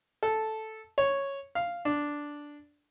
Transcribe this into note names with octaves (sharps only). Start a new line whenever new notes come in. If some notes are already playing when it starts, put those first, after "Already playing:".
A4
C#5
F5
D4